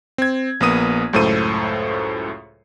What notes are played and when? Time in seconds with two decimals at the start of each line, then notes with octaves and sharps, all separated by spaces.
0.18 C4 G#6
0.60 A#1 A#3 B3 D#6 D#7
1.13 C#2 F#2 A2 A4 C5 D#7